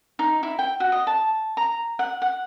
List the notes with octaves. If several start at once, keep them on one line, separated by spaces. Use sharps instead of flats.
D#4
E4
G5
F#4
D#5
A5
A#5
F#5
F#5